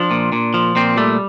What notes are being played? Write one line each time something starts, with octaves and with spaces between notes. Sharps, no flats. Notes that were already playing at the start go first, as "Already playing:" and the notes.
Already playing: F3 D4
A#2
A#2
F3
A#2 C4
G3 A3